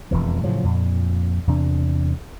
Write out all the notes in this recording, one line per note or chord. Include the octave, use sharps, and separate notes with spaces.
E1 F2 E3
A2 C#3 F3 F#3
F2 A#2
E2 C3 D4